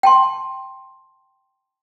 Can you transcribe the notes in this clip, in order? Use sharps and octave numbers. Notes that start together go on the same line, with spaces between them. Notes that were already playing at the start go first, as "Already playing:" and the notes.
G5 A5 C6